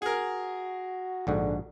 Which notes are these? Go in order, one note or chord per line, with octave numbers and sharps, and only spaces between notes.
F#4 G#4 A#4
A#1 G#2 D3 F#4